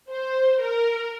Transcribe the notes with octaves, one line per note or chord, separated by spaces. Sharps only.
C5
A#4